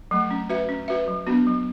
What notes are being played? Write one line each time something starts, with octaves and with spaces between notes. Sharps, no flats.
F#3 A3
C#4
F#4 B4 E5
C#4
F#4 B4 E5
F#3
B3 D4 F#4
F#3